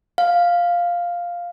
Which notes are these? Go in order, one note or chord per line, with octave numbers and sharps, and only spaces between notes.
F5